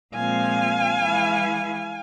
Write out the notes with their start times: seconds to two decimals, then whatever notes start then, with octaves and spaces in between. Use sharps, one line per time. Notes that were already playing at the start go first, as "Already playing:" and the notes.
0.14 A#2 F3 G#3 C4 F5 G#5
1.00 E3 G#3 E4